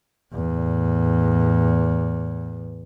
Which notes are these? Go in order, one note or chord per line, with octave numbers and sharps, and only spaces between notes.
E2 A2